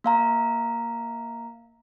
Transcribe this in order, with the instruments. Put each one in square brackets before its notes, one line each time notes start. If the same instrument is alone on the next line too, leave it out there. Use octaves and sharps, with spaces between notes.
[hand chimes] A#3 F5 A#5